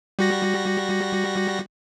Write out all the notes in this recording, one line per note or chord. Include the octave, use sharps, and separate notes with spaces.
G3 F#4 A#6